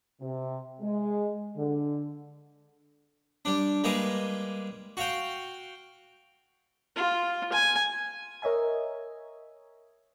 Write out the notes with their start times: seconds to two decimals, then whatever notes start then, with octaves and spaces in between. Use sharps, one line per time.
0.21 C3
0.81 G#3
1.57 D3
3.45 G3 D4
3.84 G3 G#3 A#3 G#4 B4
4.97 F#4 F5 G5
6.96 F4
7.52 G#5
8.42 A#4 C#5 D#5 E5 G#5